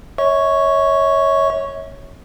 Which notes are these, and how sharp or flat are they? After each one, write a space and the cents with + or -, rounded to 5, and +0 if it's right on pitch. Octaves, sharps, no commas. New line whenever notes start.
C#5 +0 E5 -45 C#6 +0